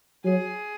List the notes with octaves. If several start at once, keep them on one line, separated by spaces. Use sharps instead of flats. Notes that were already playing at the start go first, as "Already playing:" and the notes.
F#3 G#4